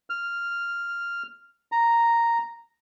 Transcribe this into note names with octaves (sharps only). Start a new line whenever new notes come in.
F6
A#5